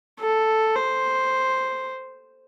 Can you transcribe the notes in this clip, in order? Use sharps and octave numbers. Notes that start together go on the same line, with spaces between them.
A4
C5